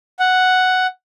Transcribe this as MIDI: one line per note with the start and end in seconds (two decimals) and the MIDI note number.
0.19 0.87 78